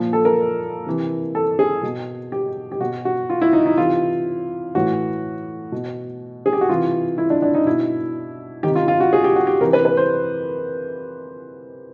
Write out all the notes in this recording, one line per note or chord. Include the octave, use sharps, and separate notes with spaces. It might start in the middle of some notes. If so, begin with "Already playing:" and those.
Already playing: A#2 F3
A4
A#4
C3 E3
A4
G#4
B2
G4
G4
B2 F#4
F#4
F4
E4
D#4
D#4
C3 E3 F4
A2 E3 F#4
B2
G#4
G4
F#4
C3 E3 F4
E4
D4
D4
D#4
B2 E4
C3 D#3 G4
F4
F4
F#4
G#4
G4
F#4
G4
C3 E3 A#4
B4
B4
C5